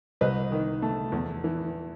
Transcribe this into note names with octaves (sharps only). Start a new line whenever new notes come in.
C2 B4 D#5
D#3
A3
E2
E3